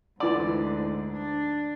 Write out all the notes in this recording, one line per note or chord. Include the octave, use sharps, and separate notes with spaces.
D2 G#2 E3 D5
D4